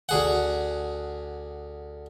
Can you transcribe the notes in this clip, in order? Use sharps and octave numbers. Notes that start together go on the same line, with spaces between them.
D2 G#4 F#5